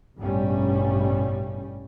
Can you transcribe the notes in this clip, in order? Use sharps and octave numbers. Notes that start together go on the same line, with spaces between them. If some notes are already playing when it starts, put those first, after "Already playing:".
A1 G2 B2 G3 C#4